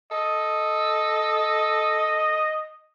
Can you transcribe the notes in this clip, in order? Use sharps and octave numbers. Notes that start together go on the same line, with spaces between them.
A4 D#5